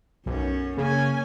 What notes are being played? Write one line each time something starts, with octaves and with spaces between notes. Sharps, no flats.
B1 F#2 C#4
C#3 A#3 C#4 G#5